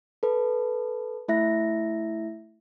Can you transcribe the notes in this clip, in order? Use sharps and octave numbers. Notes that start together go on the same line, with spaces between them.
A4 B4
A3 E4 E5 A#6